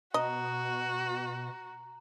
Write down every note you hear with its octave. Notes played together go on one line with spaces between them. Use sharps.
B2 F#4 D#5 A#5